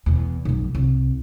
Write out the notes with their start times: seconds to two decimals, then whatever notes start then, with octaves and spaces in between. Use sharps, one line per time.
0.06 E2 B2
0.45 B1 F2
0.75 C2